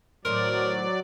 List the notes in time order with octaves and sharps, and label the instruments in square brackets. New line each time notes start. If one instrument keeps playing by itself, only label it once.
[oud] A2 D#3 C4 [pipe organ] F#3 D5 [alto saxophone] A#4